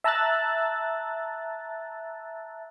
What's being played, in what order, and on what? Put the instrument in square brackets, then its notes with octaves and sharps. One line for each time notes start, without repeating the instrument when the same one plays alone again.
[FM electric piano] E5 A5 A#5 E6 F#6 A6